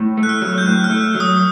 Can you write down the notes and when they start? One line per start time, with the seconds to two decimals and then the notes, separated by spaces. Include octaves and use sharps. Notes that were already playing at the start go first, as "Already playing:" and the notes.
Already playing: A2
0.17 A3
0.23 F#6
0.29 F6
0.42 F#3
0.58 G6
0.66 A2 F#6
0.84 F6
0.90 A3
1.15 F#3
1.20 D#6